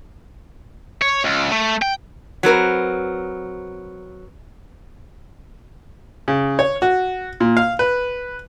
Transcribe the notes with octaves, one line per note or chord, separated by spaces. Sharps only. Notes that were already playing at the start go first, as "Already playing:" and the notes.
C#5
C#2
A3
G5
F#3 C4 A#4 B4
C#3
C#5
F#4
A#2
F5
B4